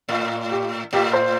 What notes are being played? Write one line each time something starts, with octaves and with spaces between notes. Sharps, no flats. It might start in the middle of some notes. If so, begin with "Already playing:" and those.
A2
G4
A2 G4
C5